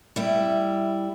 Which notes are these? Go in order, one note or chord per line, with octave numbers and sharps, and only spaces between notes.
G3 E4